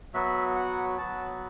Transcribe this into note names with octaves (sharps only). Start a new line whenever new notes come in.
F#3 B3 F#4 E5
F#5
F#3 B3 F#4 A5